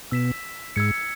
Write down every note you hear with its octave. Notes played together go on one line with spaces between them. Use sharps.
B2 E6 B6 E7
G#2 E6 G#6 C#7